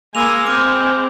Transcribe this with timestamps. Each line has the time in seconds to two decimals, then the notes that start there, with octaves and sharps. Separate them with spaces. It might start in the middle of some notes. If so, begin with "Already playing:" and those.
0.15 G#3 A#3 F5 G#5 B5 D6 E6 F7
0.47 C4 D6 F6 F7